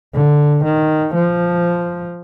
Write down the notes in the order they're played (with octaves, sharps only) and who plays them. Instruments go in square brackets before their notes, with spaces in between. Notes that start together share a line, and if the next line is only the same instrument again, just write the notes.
[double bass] D3
D#3
F3